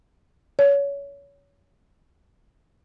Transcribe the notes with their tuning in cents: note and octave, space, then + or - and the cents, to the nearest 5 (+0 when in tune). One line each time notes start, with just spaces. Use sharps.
C#5 +25